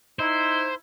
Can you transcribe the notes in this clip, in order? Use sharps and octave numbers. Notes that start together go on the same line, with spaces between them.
D#4 E4 C5